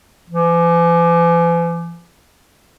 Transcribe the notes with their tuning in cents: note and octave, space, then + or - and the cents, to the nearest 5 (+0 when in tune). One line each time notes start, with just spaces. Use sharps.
E3 +45